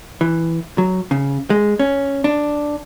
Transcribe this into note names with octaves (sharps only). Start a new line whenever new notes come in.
E3
F#3
C#3
G#3
C#4
D4